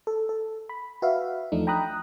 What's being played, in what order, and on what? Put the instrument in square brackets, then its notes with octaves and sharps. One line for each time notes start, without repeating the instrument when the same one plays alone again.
[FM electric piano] A4
A4
B5
F#4 B4 E5 F5
E2 F3 A3 D4 D#4
G5 A#5 B5 D#6 F#6